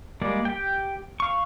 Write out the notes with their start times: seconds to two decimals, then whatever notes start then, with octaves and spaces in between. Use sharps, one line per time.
0.22 G3 G#3 A#3 D5
0.45 G4 G5
1.20 F5 C#6